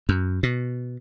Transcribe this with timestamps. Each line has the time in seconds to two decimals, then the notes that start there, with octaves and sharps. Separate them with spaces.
0.09 F#2
0.43 B2